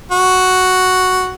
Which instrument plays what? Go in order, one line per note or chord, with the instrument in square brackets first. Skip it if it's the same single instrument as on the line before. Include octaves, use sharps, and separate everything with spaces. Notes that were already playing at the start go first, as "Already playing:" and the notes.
[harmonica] F#4